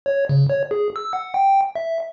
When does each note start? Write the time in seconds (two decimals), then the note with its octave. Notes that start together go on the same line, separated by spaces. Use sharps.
0.06 C#5
0.29 C#3
0.50 C#5
0.71 G#4
0.96 E6
1.13 F#5
1.34 G5
1.76 E5